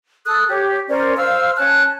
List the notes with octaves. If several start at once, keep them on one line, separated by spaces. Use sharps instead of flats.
A4 D#6 F#6
G4 C#5
C#4 A#4 C5 D5
C5 F5 E6 F6
C#4 A5 F#6